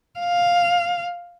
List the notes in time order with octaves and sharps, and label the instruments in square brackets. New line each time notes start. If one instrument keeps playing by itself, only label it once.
[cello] F5